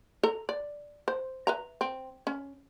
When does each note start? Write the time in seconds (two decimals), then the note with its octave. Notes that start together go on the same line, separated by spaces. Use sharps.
0.23 A4 A#5
0.49 D5
1.08 C5
1.47 B4 E5 A#5
1.81 C4
2.27 C#4